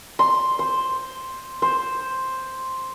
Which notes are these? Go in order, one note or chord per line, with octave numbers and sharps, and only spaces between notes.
C6
C5
C5